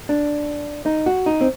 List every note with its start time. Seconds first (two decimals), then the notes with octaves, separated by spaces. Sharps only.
0.09 D4
0.86 D#4
1.06 F#4
1.26 D#4
1.41 C4